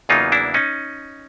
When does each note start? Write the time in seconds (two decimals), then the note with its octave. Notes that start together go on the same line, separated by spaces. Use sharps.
0.09 E2 C#3 F#3 A#3 D#4 F4
0.32 D4 E4
0.54 C#4 D#4